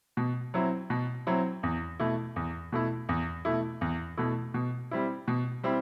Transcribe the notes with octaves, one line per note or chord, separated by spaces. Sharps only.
B2
F#3 C4 E4
B2
F#3 C4 E4
E2
B2 A3 E4
E2
B2 A3 E4
E2
B2 A3 E4
E2
B2 A3 E4
B2
G3 C4 E4
B2
G3 C4 E4